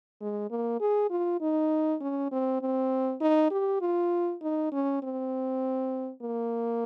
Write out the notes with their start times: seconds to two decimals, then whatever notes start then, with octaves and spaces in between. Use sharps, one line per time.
0.21 G#3
0.51 A#3
0.80 G#4
1.10 F4
1.41 D#4
2.00 C#4
2.32 C4
2.61 C4
3.21 D#4
3.51 G4
3.81 F4
4.42 D#4
4.72 C#4
5.03 C4
6.22 A#3